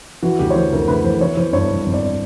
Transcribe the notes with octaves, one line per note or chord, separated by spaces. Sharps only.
E3 F#4
D2 G4
C#5
E3 C5
D2 A#4
D2 B4
E3 C5
E3 C#5
E3 C5
G2 C#5
G#1
G#1
D5